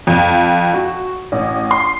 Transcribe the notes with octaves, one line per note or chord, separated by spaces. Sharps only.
F2
F#4
A1
C6